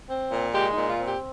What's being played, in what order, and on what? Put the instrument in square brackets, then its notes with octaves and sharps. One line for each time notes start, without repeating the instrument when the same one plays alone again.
[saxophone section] C4
A#2
G#3 G4
D#4
A#2
F4
C4
G4